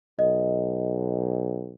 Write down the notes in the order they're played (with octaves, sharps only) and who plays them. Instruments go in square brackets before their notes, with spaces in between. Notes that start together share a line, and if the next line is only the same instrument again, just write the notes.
[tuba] B1 [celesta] D#5